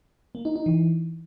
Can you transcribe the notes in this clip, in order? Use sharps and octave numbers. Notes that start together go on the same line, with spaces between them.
A#3
D#4
D#4
E3